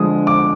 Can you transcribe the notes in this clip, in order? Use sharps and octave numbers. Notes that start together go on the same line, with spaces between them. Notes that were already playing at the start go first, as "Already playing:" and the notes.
Already playing: D3 F3 G#3 D#6
D6